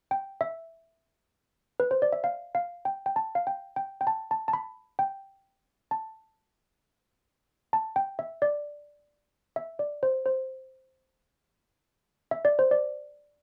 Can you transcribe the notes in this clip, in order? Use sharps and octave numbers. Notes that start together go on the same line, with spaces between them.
G5
E5
B4
C5
D5
E5
F5
F5
G5
G5
A5
F5
G5
G5
G5
A5
A5
A5
B5
G5
A5
A5
G5
E5
D5
E5
D5
C5
C5
E5
D5
C5
D5